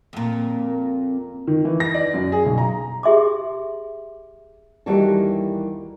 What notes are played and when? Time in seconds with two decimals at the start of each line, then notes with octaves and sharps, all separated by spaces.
0.13 F2 A#2
1.47 D#3
1.65 E3
1.80 A#6
1.94 D5
2.14 F#2
2.32 G#4
2.46 B1
2.58 A#5
3.03 G4 G#4 E5 C6 D6
4.86 D#2 E3 G3 A#3 F#4 A4